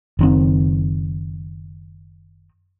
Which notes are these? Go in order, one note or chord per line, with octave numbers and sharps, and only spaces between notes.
F#1 D#3 C4